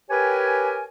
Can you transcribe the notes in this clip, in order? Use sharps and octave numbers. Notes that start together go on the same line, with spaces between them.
G4 A#4 B4 C#5 G5 G#5